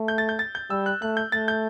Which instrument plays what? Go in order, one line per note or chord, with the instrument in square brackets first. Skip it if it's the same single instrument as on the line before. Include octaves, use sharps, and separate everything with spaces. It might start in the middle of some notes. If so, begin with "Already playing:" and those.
Already playing: [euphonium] A3
[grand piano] G6
A6
G6
A6
G6
[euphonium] G3 [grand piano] E6
[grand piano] F#6
[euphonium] A3 [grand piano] F#6
[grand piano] G6
[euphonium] A3 [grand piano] A6
[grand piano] G6